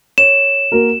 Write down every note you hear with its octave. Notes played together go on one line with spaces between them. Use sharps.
C#5 E7
A#3 F#4 A#4